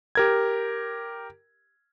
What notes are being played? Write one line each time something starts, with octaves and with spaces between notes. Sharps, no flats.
G4 A#4 G#6